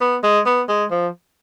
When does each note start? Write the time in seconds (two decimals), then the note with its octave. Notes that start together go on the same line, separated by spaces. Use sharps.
0.01 B3
0.24 G#3
0.46 B3
0.69 G#3
0.91 F3